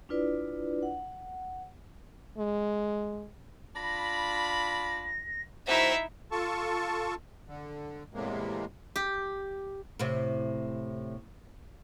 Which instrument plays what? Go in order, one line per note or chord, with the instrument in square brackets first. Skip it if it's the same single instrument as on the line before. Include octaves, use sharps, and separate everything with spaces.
[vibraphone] D4 E4 F4 B4 D5
F#5
[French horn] G#3
[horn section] D4 F4 B5 [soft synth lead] A#6
[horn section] A2 D#3 F#4 [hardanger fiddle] D#4 E4 [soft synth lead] C5 [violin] E5
[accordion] F4 A4 A5 C#6
D3
E2 A2 C3 G#3 A#3
[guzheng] G4
[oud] A2 C3